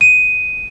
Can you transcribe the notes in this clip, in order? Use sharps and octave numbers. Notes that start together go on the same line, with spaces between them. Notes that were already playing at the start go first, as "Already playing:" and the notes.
D#7